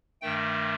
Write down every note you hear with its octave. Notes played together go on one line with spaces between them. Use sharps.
G2 D#3 A3 G5